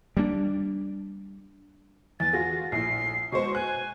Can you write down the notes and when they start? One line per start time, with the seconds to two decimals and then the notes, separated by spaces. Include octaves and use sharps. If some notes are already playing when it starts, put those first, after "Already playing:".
0.17 G3 A#3 D4
2.20 E2 A6
2.33 F4 F#4 G#4 A#6
2.72 A#1 A2 C7
3.32 B2 G#3 C5 C#6
3.55 G#5 F#6